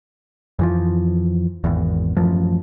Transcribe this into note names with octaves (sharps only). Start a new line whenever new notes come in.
F2 E3 F3
G#1 E2
A1 F#2 F3